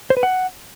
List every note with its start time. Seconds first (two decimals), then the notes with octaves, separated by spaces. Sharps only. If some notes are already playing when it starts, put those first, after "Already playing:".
0.10 C5
0.17 B4
0.23 F#5